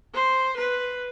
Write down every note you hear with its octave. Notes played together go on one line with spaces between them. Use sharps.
C5
B4